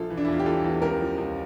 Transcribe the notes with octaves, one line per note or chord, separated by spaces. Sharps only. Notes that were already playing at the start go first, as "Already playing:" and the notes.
Already playing: A#1 F4 A4
E3
D4
E4
E2 F4
G4
E3 F4 A4
E2
C#2 G4 A#4
F3
C#2